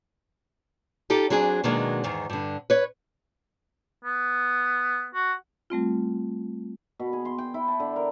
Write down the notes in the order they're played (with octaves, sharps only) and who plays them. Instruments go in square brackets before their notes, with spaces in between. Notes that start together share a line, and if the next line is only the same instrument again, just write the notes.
[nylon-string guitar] D#4 F4 G4 A4
F#3 C4 D4 G#4
B2 D#3 F#3 G#3 A#3 D4
E2 G#2 D#3
G2 D3
B4 C#5
[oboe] B3
F#4
[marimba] G3 A3 C4 F4
[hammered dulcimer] B2
G#4
C6
G5
E4
A5
D3
A#4